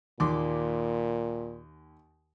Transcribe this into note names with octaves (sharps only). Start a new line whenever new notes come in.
D#2 A#2 C6 D6